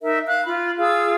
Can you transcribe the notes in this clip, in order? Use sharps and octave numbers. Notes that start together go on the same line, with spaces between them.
D#4 A#4 E5
F5 F#6
F4 B5
F4 G#4 F5 E6